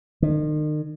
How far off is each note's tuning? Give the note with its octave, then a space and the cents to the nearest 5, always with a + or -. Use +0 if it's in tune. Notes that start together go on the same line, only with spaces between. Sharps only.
D#3 -40